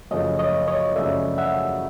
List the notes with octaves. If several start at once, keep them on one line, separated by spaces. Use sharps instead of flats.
F#2 C#3 F3 A3 C#5 D#5
C#5 D#5
C#5 D#5
F#2 C#3 F3 A3 D5 E5
E5 F#5